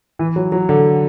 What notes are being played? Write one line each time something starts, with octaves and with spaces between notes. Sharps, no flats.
E3
F#3
F#3
D3